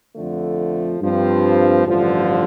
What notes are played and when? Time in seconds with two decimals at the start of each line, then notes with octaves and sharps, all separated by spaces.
0.15 F2 D3 F3 A3
1.00 G2 F3 C4
1.85 A1 G2 D3 F3